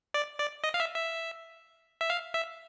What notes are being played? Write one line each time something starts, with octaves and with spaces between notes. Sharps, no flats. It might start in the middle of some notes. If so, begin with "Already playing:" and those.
D5
D5
D#5
F5
E5
E5
E5
F5
E5